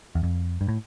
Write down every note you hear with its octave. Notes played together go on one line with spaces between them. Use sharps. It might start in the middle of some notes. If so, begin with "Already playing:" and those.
E2
F2
G2
A2